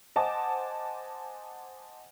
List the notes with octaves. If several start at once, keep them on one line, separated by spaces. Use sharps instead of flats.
C5 D#5 F#5 G#5 A5 D6